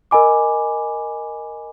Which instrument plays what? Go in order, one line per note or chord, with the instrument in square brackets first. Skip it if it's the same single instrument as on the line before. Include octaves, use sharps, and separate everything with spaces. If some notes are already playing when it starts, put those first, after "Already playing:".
[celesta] A#4 D#5 G#5 B5 D6